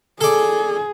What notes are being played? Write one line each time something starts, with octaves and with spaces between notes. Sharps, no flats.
G#4 A4 D5